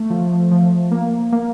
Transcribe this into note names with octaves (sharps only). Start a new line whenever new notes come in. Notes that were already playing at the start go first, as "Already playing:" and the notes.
Already playing: A3
F3
F3
A#3
A#3